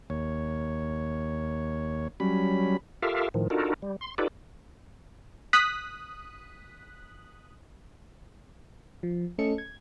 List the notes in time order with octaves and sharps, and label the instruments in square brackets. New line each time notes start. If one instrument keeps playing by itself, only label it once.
[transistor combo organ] D#2 C#5
F#3 G3 C#4 B5
[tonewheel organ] F4 G4 A4 A#4 E5 F5
A2 D#3 F3
D4 D#4 F4 F#4 A4 A#4
G3
C6
D#4 F4 G4 A4 B4 D5
[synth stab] D#6 F#6 B6
[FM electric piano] F3
A3 C#4 A4 D#5 C#7
G#6